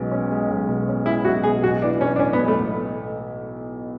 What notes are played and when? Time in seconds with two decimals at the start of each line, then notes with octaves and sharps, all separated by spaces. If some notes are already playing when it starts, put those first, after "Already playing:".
Already playing: B1 B2 G#3 C#4
0.12 C#4
0.32 G#3
0.50 B1
0.69 B2
0.88 C#4
1.06 G#3 E4
1.25 B1 F#4
1.44 B2 G#4
1.62 B1 F#4
1.82 E3 D4
2.01 B1 C#4
2.16 D4
2.19 A2 C#4
2.33 B3
2.38 B1
2.48 A3